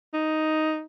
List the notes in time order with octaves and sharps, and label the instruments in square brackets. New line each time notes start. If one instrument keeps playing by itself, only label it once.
[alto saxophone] D#4